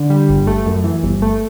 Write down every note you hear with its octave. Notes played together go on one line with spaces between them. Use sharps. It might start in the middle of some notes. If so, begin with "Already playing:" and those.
Already playing: D3
G3
G1
A3
F#2
E3
G1
A3